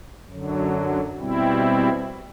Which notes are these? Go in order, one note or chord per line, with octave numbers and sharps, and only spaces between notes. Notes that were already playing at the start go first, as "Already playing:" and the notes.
F#2 D3 F#3
B2 G3 C4 E4